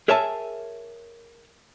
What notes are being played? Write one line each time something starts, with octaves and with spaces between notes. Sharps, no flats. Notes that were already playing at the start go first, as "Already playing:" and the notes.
G#4 A#4 C#5 E5 G#5 A5